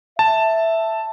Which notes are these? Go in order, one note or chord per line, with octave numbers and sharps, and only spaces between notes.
E5 A5